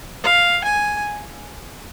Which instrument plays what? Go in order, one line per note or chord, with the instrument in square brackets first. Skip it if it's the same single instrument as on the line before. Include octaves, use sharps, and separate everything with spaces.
[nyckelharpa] F5
G#5